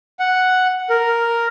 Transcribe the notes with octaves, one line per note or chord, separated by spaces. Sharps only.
F#5
A#4